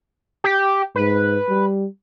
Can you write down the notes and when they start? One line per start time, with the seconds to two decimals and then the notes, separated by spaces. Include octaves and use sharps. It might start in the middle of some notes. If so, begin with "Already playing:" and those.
0.44 G4
0.96 G#2 B4
1.49 G3